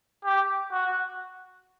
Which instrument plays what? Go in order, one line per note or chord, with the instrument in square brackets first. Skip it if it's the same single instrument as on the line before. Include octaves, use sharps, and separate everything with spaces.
[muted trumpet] G4
F#4